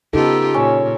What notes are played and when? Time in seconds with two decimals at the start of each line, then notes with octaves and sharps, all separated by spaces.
0.13 C#3 B3 D#4 F4 G4 A4
0.54 A#2 C#4